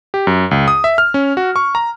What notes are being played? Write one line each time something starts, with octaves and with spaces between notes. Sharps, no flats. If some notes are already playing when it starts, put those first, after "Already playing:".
G4
F#2
C#2
D#6
E5
F6
C#4
F#4
C#6
A#5